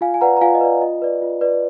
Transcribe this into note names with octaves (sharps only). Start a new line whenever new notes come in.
F4 F5 G#5
G#5
B4 D5 F#5 A#5
A#5
F4 F5 G#5
D#5
B4 D5
F4 D#5
B4 D5
F4
B4 D5